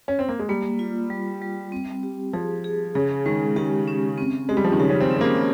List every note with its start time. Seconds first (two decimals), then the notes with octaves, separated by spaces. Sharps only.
0.08 C#4
0.19 C4
0.29 A#3
0.39 G#3
0.49 G3 A#3
0.79 F4
1.10 G3
1.42 G3
1.72 C4
2.03 G4
2.33 F3 G#4
2.64 G#4
2.95 C#3 G#4
3.26 D#3 G#3
3.56 D#3 G4
3.88 C#4
4.18 C4
4.49 G#3 G4
4.57 G3
4.64 F3
4.72 D#3
4.79 C#3 G4
4.90 C#4
5.00 C4
5.11 C#4
5.16 C4
5.21 A#3